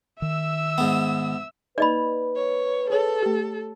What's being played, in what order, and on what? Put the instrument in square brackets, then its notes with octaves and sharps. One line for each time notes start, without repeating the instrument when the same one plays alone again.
[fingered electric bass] D#3 [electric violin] E5 E6
[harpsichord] G#2 B3
[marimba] A#3 D#4 [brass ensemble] B4 [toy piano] D5 D#5 B5
[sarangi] C#5
[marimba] G#4 C#5 [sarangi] A4
[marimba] A3 G4